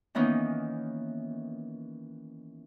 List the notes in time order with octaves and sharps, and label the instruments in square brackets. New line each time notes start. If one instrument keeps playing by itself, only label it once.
[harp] D#3 E3 A#3 B3 C#4 D#4